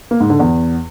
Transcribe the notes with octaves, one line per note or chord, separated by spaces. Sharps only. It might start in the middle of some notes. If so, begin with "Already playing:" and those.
A#3
G#2
D3
E2